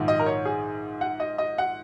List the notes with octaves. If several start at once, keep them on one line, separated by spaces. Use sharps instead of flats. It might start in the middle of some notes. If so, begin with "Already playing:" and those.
Already playing: A#1 G#2 D#3
D#5
A#4
C#5
G#4
F#5
D#5
D#5
F#5